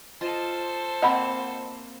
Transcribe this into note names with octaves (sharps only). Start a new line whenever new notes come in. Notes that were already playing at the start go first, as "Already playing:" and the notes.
F4 A4 C5 D#5 A5
A#3 C4 D#5 F#5 B5